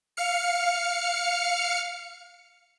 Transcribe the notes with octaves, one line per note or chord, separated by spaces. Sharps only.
F5 F6 C#7